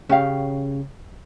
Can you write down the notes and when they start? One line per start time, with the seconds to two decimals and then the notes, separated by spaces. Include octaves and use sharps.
0.09 C#3 C#4 G4 F5